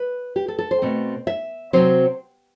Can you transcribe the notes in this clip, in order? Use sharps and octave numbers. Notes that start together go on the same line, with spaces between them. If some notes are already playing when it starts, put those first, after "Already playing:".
Already playing: B4
G4
A4
A4
C5
B2 A3 C4
E5
C3 F#3 C4 C5